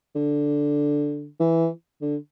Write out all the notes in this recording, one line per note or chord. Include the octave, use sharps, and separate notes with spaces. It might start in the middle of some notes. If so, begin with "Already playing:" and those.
D3
E3
D3